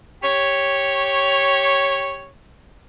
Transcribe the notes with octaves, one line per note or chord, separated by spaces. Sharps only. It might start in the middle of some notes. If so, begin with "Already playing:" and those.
G4 C#5